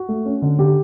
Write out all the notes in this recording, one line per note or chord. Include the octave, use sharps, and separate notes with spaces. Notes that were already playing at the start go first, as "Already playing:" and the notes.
Already playing: F#4
A3
C#4
D3
D3 G4